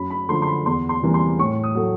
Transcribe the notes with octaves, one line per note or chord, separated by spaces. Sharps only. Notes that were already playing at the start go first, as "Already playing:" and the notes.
Already playing: F#2 B5
B5
D3 F3 A3 C6
C6
B5
E2 C6
C6
C3 E3 G3 A#3
C6
A2 C#6
D#6
F#3 A3